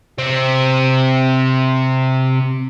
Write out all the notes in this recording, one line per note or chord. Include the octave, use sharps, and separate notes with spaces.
C3 C4